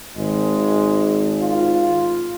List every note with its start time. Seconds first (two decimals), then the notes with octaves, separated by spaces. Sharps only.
0.18 G#1 G#3
1.39 F4